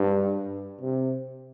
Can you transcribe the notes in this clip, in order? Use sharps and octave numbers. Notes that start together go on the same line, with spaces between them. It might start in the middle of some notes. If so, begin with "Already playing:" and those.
Already playing: G2
C3